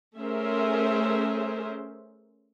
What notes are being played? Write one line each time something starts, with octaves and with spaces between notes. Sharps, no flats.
A3 C#4 G#4 A#4 C5 E5